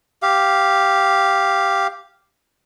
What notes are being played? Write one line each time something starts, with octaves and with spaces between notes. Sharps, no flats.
G4 F5